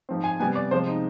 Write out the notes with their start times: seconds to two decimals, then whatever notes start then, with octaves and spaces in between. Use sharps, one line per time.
0.09 G#2 F3 C4
0.24 G#5
0.40 C3 G3 B3 G#5
0.55 D5
0.71 C3 F3 G#3 C5
0.88 D#4